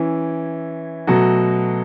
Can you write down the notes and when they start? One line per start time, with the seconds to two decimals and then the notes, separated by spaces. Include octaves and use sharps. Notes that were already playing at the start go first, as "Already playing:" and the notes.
Already playing: E3 C#4 E4
1.07 B2 F#3 A3 F#4 A4